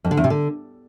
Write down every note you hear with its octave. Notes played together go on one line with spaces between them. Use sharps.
F2
D3
E2
C3
D3